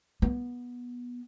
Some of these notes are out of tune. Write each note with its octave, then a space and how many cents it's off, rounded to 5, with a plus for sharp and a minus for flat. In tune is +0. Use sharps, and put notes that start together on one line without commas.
B3 -15